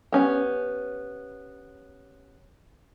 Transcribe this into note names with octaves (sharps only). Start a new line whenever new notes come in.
B3 C#4 G4